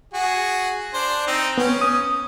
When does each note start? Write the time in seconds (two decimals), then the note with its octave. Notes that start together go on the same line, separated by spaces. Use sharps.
0.13 F#4 G#4
0.94 D4 C5
1.27 C4 D#4
1.58 B3 C#4
1.81 D#6